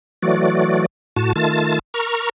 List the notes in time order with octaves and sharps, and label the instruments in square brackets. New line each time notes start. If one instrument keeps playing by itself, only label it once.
[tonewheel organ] E3 F#3 A3 F#4 D5
A2 F#4 A5
D#3 A3 F4 A5 A6
A#4 A#5 C#6